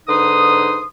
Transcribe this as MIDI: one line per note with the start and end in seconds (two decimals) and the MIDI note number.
0.08 0.83 44
0.08 0.83 50
0.08 0.83 63
0.08 0.83 71
0.08 0.83 84
0.08 0.83 87